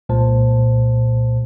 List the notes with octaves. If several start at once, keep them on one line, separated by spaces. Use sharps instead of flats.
C2 A#2 G#3 C5 A5